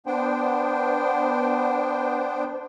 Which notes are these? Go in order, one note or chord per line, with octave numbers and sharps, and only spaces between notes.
B3 D4 C5 G5